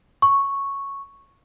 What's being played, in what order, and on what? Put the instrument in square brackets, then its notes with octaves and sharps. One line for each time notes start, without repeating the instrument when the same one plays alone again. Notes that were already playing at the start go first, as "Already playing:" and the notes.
[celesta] C#6